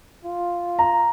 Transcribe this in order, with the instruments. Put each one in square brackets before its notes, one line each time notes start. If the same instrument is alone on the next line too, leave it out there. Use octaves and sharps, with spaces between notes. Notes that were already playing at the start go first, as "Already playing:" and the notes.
[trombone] F4
[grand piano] A#5